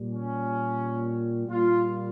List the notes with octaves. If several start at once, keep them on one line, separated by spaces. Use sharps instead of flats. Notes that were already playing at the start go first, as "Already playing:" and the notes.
Already playing: A#2 G3
C#4
A#2 G3 F4